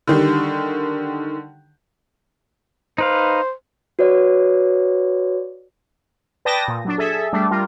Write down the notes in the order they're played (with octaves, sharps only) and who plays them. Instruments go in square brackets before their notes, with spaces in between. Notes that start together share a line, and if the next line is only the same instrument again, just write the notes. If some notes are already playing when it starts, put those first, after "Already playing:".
[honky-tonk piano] D3 D#3 G3
[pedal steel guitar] D#4 B4 F5 [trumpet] C5
[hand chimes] F#4 B4 C#5 D5
[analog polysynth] B4 D5 G5 A5 D#6 A#6
A#2
F#3 D4
G#4 A4 E5
G3 A3 D4
G3 F4 A#4